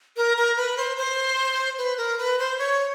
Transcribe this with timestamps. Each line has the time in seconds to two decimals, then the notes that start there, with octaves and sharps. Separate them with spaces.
0.17 A#4
0.37 A#4
0.57 B4
0.77 C5
0.97 C5
1.78 B4
1.98 A#4
2.18 B4
2.39 C5
2.59 C#5